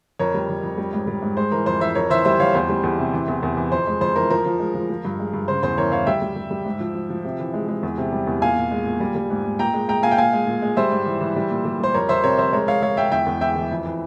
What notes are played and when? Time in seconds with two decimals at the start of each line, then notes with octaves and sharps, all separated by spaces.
0.19 F2 A#4 C#5
0.34 G3
0.49 F2
0.63 F2
0.78 G3
0.93 G#2
1.07 G3
1.22 G#2
1.37 G#3 C5
1.52 E3 A#4
1.66 F2 C5
1.81 E3 C5 E5
1.95 F2 A#4 C#5
2.10 E3 C5 E5
2.25 G3 C5 E5
2.40 F2 C#5 F5
2.54 E2 C5
2.69 G3
2.83 E2
2.99 C3
3.13 E3
3.28 E2
3.43 E2
3.57 E3
3.72 F2 C5
3.87 G#3
4.01 F2 C5
4.16 E3 A#4
4.30 F3 A#4
4.46 F3
4.60 G#3
4.75 F3
4.90 F3
5.05 G2
5.19 G#3
5.34 G2
5.48 C#3 C5
5.63 E2 C5
5.77 E3 A#4 C#5
5.92 E3 C#5 F5
6.07 G3 E5 G5
6.22 G3
6.36 G3
6.51 G3
6.65 G#2
6.80 F3
6.95 F3
7.10 F3
7.25 C3
7.39 E3
7.54 G#3
7.69 G#3
7.83 E2
7.98 C3
8.12 G3
8.27 E2
8.42 A#2 F5 G#5
8.56 A#2
8.71 G#3
8.86 A#2
9.00 G3
9.15 G3
9.30 G#2
9.45 G#2
9.59 A#2 G5 A#5
9.74 G#3
9.88 G#3 G5 A#5
10.03 A#2 F5 G#5
10.11 G5
10.18 A#2 F5 G#5
10.33 G#3
10.47 A#2
10.62 G#3
10.77 G3 C5 E5
10.92 G#2
11.06 E3
11.21 E3
11.36 G3
11.50 A#2
11.65 G3
11.80 G3 C5
11.94 F2 A#4 C#5
12.09 F2 C5 E5
12.23 C3 A#4 C#5
12.38 F2 C5 E5
12.53 G#3 A#4 C#5
12.68 G#3 C#5 F5
12.82 G#3 C#5 F5
12.97 G#3 E5 G5
13.12 E2 E5 G5
13.26 E2
13.41 E3 E5 G5
13.56 E3
13.71 F2
13.86 E3